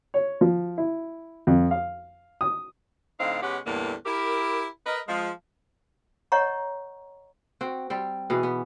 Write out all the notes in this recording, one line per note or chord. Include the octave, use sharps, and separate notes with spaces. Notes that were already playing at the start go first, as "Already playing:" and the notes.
C#5
F3
E4
F2
F5
D#6
A2 D3 C4 D#4 F5
B2 G#3 C#4 G4 F#5
E2 A2 D3 E3 G3 A#3
E4 G4 A#4
A#4 B4 D#5
F3 G#3
C#5 D#5 F#5 A#5 C#6
C4 F#4
G3 C4
B2 E3 G#4
B3